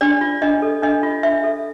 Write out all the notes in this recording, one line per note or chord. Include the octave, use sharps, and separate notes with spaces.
D4 D5
F4
D4 D#5
A4
D4 D#5
F4
D4 E5
A4